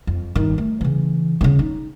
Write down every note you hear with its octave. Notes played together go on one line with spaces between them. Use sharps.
F2
G1 D#3
A3
C#3 E3
A1 C#3
D#4